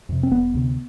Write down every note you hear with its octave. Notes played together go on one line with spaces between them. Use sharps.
F2 C3
C4
E1 B3
D2 C3